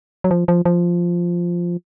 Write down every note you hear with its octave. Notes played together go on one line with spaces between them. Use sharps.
F#3
F3
F3
F3